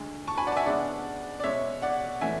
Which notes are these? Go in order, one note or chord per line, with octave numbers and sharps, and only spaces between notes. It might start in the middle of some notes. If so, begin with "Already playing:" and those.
Already playing: D2 D3 G#3
A5 C#6
G#5 B5
D5 F#5
A5
E5 G#5
C#3 G#3 B3 D4 D5 F#5
D5
B2 G#3 C#4 C#5 E5
D5 F#5
A2 E3 A3 C#4 E5 G#5